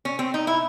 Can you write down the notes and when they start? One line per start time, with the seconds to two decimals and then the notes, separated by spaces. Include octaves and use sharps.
0.05 C#4
0.19 C4
0.34 D#4
0.47 E4